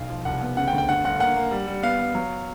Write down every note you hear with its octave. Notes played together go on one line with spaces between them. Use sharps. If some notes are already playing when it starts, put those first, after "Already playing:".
Already playing: B1 F5
F3
C2 F#5
B3
C#3 F#5
G5
D2
G5
G2 F#5
G1 F#5
A#3 F#5
A#3
G3
G3
B3 F5
B3
F#3